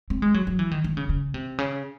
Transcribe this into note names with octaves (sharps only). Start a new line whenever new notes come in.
C4
G#3
F#3
F#3
E3
D#3
D#3
C#3
C#3
C3
C#3